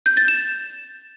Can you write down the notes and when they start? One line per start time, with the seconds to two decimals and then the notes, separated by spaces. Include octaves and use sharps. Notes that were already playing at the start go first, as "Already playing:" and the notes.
0.06 G6
0.17 A6
0.28 E7